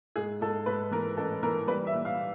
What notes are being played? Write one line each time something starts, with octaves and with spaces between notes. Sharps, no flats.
G#2 G#4
G#2 A4
G#2 B4
E3 A#4
A1 A4
E3 A#4
G3 B4
E5
A#2
F5